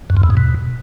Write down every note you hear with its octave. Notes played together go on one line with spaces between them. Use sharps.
F#2
F2
E2
G#2
B2